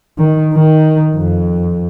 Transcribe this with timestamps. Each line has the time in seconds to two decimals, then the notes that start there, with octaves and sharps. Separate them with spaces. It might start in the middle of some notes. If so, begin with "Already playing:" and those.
0.18 D#3
0.54 D#3
1.15 F2